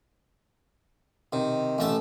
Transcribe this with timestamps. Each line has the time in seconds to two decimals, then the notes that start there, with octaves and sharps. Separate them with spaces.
1.33 C3 D#3
1.78 A1 A3 A5